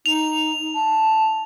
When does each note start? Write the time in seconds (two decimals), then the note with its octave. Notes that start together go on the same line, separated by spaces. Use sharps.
0.06 D#4 F7
0.75 A5